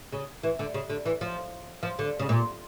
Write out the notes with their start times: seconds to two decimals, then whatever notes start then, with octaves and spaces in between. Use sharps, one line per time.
0.13 C#3
0.43 E3
0.59 D3
0.74 C#3
0.90 D3
1.05 E3
1.21 F3
1.83 F3
1.99 D3
2.19 C#3
2.29 A#2